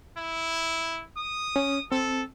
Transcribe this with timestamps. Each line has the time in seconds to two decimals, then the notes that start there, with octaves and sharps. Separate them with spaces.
0.17 E4
1.17 D#6
1.56 C#4
1.92 C4 A4